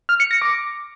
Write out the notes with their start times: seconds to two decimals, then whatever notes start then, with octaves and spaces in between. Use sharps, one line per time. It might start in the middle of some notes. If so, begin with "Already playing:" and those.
0.09 F6
0.20 C#7
0.31 A#6
0.42 D6